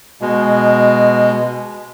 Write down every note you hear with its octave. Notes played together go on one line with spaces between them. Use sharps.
B2 G#3